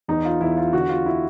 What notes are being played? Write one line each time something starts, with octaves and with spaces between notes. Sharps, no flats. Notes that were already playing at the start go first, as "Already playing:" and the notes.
E2 D#4
F4
E2 E4
F4
D3 F#4
F4
E4